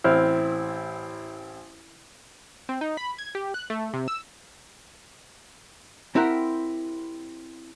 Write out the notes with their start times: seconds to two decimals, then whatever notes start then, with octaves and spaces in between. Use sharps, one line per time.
0.04 A1 C4 E4 F6
2.69 C4
2.81 D#4
2.97 B5
3.18 G#6
3.35 G4
3.54 F#6
3.70 A3
3.94 C3
4.08 E6
6.15 C4 E4 G4 A#4 F#5